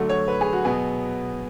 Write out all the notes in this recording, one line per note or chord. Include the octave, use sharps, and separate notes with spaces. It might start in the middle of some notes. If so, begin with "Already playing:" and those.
Already playing: D3 F#3 A3
C#5
B4
G#4
F#4
B2 F#3 B3 G#4